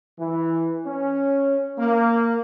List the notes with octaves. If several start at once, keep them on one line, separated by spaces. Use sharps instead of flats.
E3
C#4
A#3